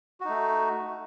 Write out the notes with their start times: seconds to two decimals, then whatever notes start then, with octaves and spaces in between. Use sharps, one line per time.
0.20 F#4
0.25 D#4
0.29 A3